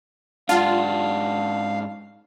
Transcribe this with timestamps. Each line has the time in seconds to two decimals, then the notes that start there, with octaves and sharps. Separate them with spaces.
0.49 G#2 D4 F4 F5 F#5 A5